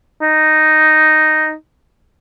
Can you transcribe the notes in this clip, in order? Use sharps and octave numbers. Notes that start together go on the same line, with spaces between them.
D#4